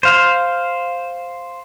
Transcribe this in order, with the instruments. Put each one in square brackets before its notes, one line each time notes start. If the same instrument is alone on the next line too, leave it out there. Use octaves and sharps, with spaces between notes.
[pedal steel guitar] C5 F5